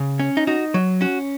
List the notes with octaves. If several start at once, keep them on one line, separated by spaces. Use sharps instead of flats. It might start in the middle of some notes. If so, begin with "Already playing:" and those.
Already playing: C#3
C#4
D#4
D#4 F#4
F#3
C#4 F#4